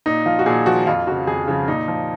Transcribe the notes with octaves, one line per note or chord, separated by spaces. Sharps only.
A#2 D#4
F3 F4
F#4
A#2 G#4
F3 F#4
F2 F4
C#3 F3 F#4
F2 G#4
C#3 F3
A#2 D#4
F3